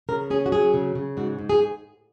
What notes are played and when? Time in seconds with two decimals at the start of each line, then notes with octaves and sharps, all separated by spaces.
0.09 C#3 A#4
0.30 C#4 G#4
0.46 F#4
0.52 F#3 G#4
0.74 C#3
0.95 C#3
1.17 G#2 F#4
1.39 G#2
1.50 G#4